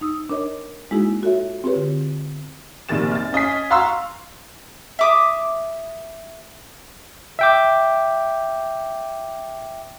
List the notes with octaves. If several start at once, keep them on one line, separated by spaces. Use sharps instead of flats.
D#4 D#6 E6
D4 A#4 C#5 D#5
G#3 A#3 D#4 E4 F#4 G#4
F4 F#4 A4 C#5 E5
C4 F4 G4 G#4 B4 C#5
D3
A#1 C3 D#3 A6 E7
F6 A6
C#4 D#5 G#5 B6
F5 F#5 A#5 C6 C#6 E6
E5 D6 D#6
E5 G5 D6